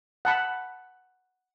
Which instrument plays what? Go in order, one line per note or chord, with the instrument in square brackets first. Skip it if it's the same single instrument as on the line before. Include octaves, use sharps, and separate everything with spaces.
[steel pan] F#5 A5 B5